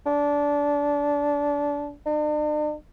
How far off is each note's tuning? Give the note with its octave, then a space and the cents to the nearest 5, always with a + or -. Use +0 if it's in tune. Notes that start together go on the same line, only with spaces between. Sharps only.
D4 -20
D4 +45